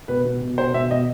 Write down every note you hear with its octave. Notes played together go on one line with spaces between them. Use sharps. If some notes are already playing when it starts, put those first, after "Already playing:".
B2 B4
B2
B2
B2 C5
B2 E5
B2 D#5